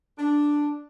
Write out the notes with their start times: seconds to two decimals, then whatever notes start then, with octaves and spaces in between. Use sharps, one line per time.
0.17 D4